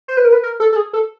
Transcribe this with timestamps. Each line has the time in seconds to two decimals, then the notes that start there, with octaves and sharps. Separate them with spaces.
0.08 C5
0.17 B4
0.25 A#4
0.33 B4
0.43 A#4
0.60 A4
0.72 A4
0.76 G#4
0.93 A4